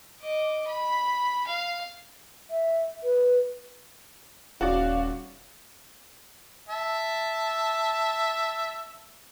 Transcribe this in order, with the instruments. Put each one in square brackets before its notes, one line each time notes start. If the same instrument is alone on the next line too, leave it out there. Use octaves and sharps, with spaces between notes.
[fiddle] D#5 D6
B5
F5
[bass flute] E5
B4
[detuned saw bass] D#1 [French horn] C#4 [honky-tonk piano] F#4 D5 [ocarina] F5
[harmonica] E5 A5